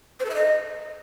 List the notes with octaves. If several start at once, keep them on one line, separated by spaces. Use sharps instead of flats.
C5
A4
E5
D#5